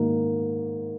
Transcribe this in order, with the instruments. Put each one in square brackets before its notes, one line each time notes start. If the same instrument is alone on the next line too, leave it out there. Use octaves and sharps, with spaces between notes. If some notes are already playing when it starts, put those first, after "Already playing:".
Already playing: [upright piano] G#2 D#3 A#3